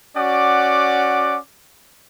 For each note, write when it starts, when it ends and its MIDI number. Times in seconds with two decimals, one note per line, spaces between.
0.17 1.38 61
0.17 1.38 66
0.17 1.38 74
0.17 1.38 78
0.17 1.38 86